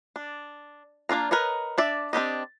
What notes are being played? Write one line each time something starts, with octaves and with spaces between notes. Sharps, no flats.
D4
A#3 D4 F4 A#5
A#4 B4 C#5 D#5
D4 D5 E5
C4 D4 G4 D#5